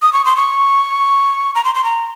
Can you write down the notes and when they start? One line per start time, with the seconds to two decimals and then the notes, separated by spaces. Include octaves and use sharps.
0.02 D#6
0.13 C#6
0.25 C6
0.36 C#6
1.55 A#5
1.65 C6
1.75 C6
1.84 A#5